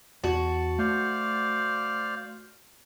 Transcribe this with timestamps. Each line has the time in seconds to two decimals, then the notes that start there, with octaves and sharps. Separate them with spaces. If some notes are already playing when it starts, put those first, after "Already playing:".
0.24 E2 F#4 A5
0.79 A3 C5 D5 F5